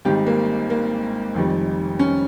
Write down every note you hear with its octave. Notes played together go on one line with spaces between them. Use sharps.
G#1 G#2 D#3 G3 G4
A#3
A#3
F1 F2 D#3 G3
C#4